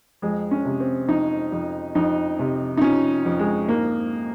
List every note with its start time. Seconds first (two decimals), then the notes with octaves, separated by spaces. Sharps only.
0.22 F2 G#3
0.51 C#4
0.65 C3
0.80 C4
1.09 F2 D#4
1.52 F2
1.95 F2 D#4
2.39 C3
2.77 D#4
2.81 F3 C#4
3.26 F2
3.39 G#3
3.69 G#2 A#3